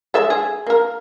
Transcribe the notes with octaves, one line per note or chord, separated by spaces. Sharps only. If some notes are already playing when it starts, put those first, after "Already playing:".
G#3 A4 E5
G#4
A#3 A#4